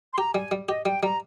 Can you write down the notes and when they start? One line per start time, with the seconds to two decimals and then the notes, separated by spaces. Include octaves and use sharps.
0.13 C6
0.18 G4 A#5
0.35 G3 G#5
0.51 G3
0.69 G4 D#5
0.85 G3 G5
1.02 G3 A#5